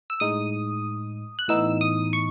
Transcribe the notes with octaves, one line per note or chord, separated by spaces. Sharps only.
E6
A2 G#3 D#4 D#6
F#6
A2 E3 B3 D#4 E6
D#6
C#6